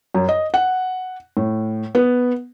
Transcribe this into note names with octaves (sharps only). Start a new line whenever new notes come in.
F#2
D#5
F#5
A2
B3